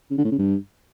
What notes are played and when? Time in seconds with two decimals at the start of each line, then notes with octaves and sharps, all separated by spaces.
0.11 C#3
0.18 D3
0.25 A2
0.32 C#3
0.38 G2